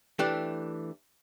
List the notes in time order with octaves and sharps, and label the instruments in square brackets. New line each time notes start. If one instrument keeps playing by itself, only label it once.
[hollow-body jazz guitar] E3 A3 D4 G4